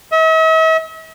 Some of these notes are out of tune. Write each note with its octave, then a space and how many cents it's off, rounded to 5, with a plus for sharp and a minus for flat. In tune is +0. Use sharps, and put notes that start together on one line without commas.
E5 -45